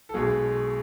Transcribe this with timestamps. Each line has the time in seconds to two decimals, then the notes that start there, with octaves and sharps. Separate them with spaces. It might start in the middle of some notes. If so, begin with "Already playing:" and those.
0.09 A4
0.14 B1 B2 G#3 G#4